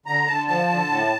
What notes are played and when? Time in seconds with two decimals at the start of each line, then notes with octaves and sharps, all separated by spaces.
0.06 D3 A#5
0.27 D3 A5
0.47 F3 A5
0.69 D3
0.89 A2